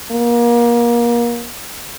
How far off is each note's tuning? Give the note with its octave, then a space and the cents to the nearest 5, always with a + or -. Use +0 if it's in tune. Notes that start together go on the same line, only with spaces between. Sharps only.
A#3 +30